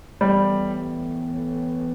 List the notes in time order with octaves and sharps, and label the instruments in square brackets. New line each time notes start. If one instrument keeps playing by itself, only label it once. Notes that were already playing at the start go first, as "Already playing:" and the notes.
[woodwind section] A2 E3 B3 [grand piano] G3